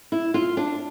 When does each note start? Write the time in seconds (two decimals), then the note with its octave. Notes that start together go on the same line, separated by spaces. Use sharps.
0.12 E4
0.34 F4
0.57 D4